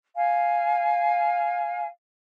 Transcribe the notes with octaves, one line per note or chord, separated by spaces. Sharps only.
F5 G#5